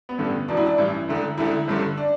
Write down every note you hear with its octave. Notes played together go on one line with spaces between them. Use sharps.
B3
A1 G2 D3
E1 E2 B2 D4
E4
D4
A1 G2 E3 E4
E1 D2 D3
E1 D2 D3 E4
G1 G2 D3
D4